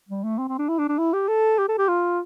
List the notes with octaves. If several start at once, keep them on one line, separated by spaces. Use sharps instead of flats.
G3
A3
C4
C4
D4
E4
D4
D4
E4
G4
A4
G4
A4
G4
F4